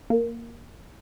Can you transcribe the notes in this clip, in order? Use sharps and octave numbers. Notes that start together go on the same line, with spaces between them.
A#3